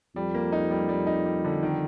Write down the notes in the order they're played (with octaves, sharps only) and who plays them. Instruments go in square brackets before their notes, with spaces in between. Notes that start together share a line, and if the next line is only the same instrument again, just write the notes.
[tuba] F2 [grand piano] G3
[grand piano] A#3
D#4
G3
G3
D#4
G3
D3
D#3